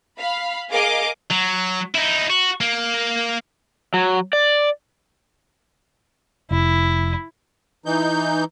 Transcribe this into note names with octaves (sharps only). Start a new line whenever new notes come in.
F5 B5
G#4 A#4 D#5 F5 D6
F#3
D#4 E4
F#4
A#3
F#3
D5
F1 E4
E3 D#4 G6